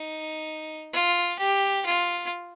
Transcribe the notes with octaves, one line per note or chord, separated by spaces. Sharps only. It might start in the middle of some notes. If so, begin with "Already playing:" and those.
Already playing: D#4
F4
G4
F4